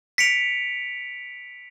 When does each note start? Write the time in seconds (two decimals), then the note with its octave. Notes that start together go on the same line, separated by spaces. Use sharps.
0.18 B6 C#7 D7 F7